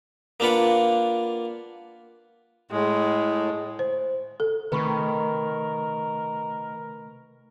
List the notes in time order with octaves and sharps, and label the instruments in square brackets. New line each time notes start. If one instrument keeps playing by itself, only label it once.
[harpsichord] A#3 D4 F4 B4 F#5
[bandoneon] A2 [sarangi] G#3
[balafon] C5
A4
[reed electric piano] C3 A3 [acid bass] D#3 [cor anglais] A#4 [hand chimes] B4 B5 C#6